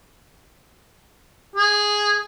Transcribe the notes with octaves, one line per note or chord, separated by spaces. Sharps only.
G#4